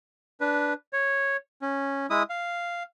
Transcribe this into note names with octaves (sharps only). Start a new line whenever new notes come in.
D4 B4
C#5
C#4
G#3 E4 D#6
F5